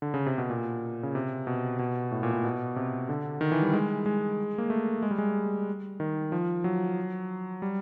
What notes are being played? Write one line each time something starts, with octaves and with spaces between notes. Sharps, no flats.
D3
C#3
C3
B2
A#2
C#3
C3
B2
B2
A2
A#2
A2
B2
C3
D3
D#3
E3
G3
G#3
G#3
A#3
A3
G#3
G3
G#3
D#3
F3
F#3
G3